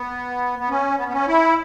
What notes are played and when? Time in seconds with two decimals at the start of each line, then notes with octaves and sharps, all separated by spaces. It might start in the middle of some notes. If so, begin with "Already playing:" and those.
Already playing: B3
0.59 B3
0.69 C#4
0.98 B3
1.08 B3
1.13 C#4
1.28 E4